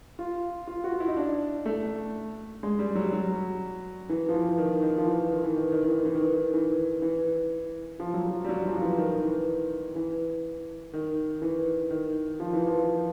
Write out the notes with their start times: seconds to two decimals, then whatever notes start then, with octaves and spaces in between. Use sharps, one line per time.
0.19 F4
0.67 F4
0.84 F#4
0.92 F4
1.00 E4
1.08 D#4
1.17 D4
1.66 A3
2.63 G#3
2.79 G3
2.95 F#3
3.05 G3
3.12 F#3
4.09 E3
4.29 F3
4.34 E3
4.58 D#3
4.83 D#3
4.98 F3
5.07 E3
5.32 D#3
5.44 E3
5.56 D#3
5.72 D#3
5.84 D#3
5.89 E3
6.05 E3
6.15 D#3
6.33 D#3
6.54 E3
7.02 E3
8.00 F3
8.14 F#3
8.27 F3
8.45 G3
8.49 F#3
8.65 F3
8.76 F3
8.81 E3
8.98 D#3
9.22 E3
9.95 E3
10.94 D#3
11.42 E3
11.91 D#3
12.40 F3
12.53 E3
12.67 F3